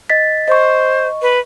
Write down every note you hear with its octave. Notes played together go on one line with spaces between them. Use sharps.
D#5 A6 B6
C5 D#5 C#6
B4